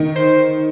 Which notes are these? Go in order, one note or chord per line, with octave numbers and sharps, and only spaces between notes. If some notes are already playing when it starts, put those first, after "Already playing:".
Already playing: D#3
C5